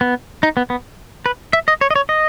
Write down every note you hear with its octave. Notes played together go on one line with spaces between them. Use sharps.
B3
D#4
B3
B3
B4
E5
D#5
C#5
D#5
C#5
D#5